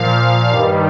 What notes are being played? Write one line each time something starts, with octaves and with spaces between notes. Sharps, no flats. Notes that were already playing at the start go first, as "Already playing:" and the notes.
Already playing: A#2 F3 F5
G2 D#3 G3